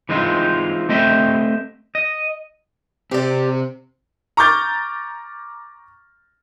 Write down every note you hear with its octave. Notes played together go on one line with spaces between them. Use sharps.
E3 G#3 C4 D#4 F4
A3 C4 D#5 E5 G5
D#5
C3 C4 G4 D5
A#5 C#6 D6 F6 G6 A6